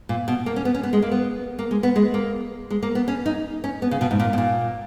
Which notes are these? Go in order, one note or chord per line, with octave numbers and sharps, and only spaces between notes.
A#2
B2
A#3
C#4
B3
C#4
B3
G#3
A#3
B3
A#3
G#3
B3
G#3
A#3
G#3
A#3
B3
C#4
D#4
C#4
B3
C#3
B2
G#2
A#2
B2
A#2